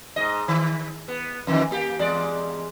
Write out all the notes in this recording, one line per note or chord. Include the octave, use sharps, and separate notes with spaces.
G#2 D#5
D#3
B3
F2 D#3 E3
A#3 G4
E2 G#3 D5